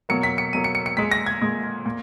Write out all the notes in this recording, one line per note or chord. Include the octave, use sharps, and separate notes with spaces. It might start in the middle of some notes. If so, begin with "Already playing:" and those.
B2 F#3 A#3 C#7
B6
C#7
B2 F#3 A#3 D#7
C#7
C#7
C#7
A#2 G#3 B6
A#6
G#6
A#2 G#3
A#2